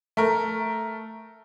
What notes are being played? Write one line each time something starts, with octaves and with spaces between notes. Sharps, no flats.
A3 A#4